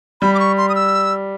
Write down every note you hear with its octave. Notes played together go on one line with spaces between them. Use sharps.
G3 B5
D6
C#6
C6
D#6
E6